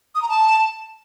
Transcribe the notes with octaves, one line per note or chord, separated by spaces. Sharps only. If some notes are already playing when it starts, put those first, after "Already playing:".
D#6
A#5
A5